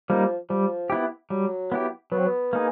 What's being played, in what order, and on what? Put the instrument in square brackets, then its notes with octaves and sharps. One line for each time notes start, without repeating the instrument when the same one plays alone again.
[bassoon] F3 [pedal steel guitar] G3 A#3 D#4
[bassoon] F3 [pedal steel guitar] G3
[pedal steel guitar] B3 E4 G4
[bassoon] F#3 [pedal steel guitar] G3
[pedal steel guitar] B3 E4 G4
[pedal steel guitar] F#3 [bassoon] B3
[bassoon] C4
B3
[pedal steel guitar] A#3 D#4 G#4